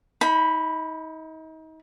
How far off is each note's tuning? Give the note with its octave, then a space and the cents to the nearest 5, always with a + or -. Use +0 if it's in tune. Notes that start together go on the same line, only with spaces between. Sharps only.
D#4 +35 B5 +0